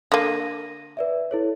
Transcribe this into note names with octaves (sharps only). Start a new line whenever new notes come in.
D3 A#3 A#6 D#7
B4 D5 E5
E4 A4 C#5